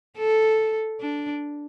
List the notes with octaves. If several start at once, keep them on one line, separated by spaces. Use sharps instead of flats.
A4
D4